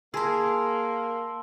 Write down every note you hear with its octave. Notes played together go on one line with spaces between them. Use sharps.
A#3 G#4 A#4 A5 C6 E6